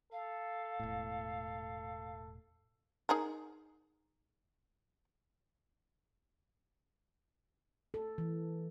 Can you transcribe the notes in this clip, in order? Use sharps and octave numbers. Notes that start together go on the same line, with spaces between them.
A4 F5
E1 A2
D#4 G#4 A#4
A4
E3